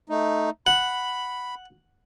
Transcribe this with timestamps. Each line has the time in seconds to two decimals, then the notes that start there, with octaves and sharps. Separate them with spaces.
0.09 A3 D#4
0.67 F#5 B5